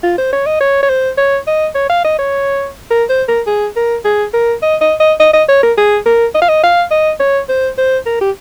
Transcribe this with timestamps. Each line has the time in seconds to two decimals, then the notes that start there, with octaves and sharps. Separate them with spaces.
0.03 F4
0.18 C5
0.32 C#5
0.46 D#5
0.61 C#5
0.82 C#5
0.90 C5
1.17 C#5
1.47 D#5
1.75 C#5
1.90 F5
2.04 D#5
2.19 C#5
2.91 A#4
3.10 C5
3.28 A#4
3.47 G#4
3.76 A#4
4.04 G#4
4.34 A#4
4.62 D#5
4.81 D#5
5.00 D#5
5.20 D#5
5.33 D#5
5.48 C#5
5.63 A#4
5.77 G#4
6.06 A#4
6.35 D#5
6.42 F5
6.49 D#5
6.63 F5
6.91 D#5
7.20 C#5
7.49 C5
7.78 C5
8.06 A#4
8.21 G4